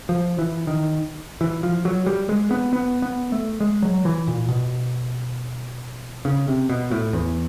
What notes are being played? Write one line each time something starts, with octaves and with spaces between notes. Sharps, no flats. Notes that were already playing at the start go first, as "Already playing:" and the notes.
F3
E3
D#3
E3
F3
F#3
G3
G#3
B3
B3
B3
A3
G#3
F#3
E3
A#2
B2
C#3
C3
B2
A2
E2